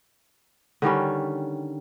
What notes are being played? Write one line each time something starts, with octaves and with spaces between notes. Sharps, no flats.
D3 D#3 G3 C#4